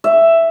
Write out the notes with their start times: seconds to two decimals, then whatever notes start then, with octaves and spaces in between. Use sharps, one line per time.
0.04 E5